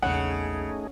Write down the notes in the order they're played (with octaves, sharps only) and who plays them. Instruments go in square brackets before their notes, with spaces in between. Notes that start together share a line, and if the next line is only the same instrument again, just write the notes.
[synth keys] A#1 E2 [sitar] C#3 [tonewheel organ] A3 D#4 G#4 [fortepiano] F#5